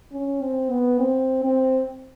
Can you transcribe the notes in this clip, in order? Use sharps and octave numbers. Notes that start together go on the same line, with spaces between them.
C#4
C4
B3
C4
C4